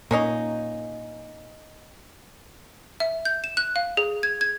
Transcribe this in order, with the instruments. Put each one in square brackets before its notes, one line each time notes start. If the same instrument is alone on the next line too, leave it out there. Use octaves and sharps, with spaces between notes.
[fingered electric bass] A#2 [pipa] A#3 C#4 D#4
[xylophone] E5
G6
E7
F#6
F5
G#4
G#6
G#6